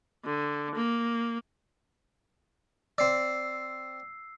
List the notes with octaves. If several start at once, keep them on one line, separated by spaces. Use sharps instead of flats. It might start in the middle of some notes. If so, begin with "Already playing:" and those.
D3
A#3
C4 D5 E6 C7